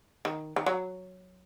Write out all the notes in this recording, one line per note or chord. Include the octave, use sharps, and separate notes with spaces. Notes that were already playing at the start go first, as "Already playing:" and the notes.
D#3
D#3
F#3